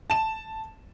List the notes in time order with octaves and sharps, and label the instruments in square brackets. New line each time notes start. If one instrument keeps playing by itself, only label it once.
[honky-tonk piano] A5 E7